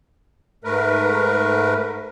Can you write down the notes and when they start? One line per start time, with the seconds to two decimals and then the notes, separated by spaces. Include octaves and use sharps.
0.64 G#2 A3 A#4 B4